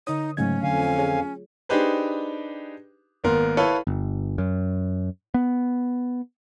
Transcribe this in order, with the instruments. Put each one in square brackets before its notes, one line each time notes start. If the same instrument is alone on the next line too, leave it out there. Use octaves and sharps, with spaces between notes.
[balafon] D3 C#5 [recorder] D#4 [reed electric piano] D#6
[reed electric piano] G#2 C#3 G#6 [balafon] F#3 A3 [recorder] C#4
[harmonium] F2 F5 G#5 [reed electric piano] D3
[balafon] F4 G#4 C#5
[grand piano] D4 D#4 G4 G#4 B4 C5
G#1 A#3 B3 A#4 C6
E4 A4 B4 C#5 F5
[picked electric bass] G1
F#2
B3